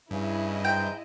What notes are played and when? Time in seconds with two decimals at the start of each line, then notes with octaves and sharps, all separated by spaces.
0.11 G2 C#3 E4 D#5
0.65 G#2 G5